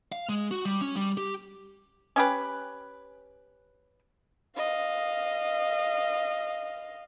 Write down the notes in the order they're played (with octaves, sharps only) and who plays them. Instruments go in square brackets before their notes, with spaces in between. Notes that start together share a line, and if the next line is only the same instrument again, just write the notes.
[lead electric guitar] F5
G#3
F#4
G3
C#4
G3
G4
[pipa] C#4 G4 B4
[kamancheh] D#5 F5